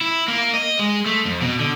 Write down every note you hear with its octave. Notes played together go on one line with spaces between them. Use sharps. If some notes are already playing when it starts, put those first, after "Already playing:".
E4
A#3
D#5
G#3
A3
F2
B2
D3